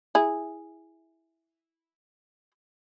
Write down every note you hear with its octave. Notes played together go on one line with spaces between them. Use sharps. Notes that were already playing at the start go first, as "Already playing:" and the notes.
E4 G#4